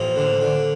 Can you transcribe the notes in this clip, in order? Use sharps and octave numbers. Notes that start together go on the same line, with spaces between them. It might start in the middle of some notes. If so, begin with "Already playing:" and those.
Already playing: A1 F3 A#3
D3
D3